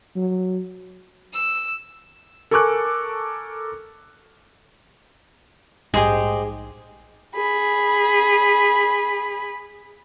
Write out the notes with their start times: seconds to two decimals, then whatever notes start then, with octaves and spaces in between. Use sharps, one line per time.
0.16 F#3
1.33 E6
2.51 A4 A#4 G#5 C#6 D6 F#6
5.94 A#1 G#2 G4 G#4 C5 D#5
7.36 G#4 B5